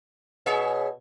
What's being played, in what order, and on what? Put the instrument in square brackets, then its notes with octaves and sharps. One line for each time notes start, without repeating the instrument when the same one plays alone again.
[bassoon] B2 [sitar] G#4 C#5 E5